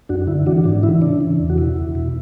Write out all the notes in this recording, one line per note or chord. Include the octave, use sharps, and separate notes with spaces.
F#2 D4 F#4
D3 E4
E3 D4 F#4
G#2 D4
E3 E4
C#3 D4
E3
E2
F#4
B2 E4
E2
B2